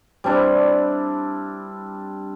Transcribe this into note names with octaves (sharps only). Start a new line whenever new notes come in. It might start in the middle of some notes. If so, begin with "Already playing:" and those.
G3 C4 D4 E4